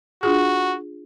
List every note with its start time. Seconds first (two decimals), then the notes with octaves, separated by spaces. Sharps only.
0.23 D4 F4 F#4 G#4